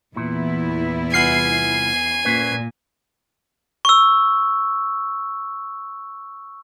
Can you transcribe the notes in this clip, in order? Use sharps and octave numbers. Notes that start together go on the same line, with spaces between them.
E2 A#2 B3 E4
C2 F4 F#5 G#5 C7
A#2 C#4 B4 C5
C#6 E6